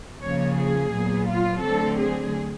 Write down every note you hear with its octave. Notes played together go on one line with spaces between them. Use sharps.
C#3 F3 A#3 C#5
G#4
A#2 F#3 B3
F4
D3 F#3 A3 C4 A4
G#4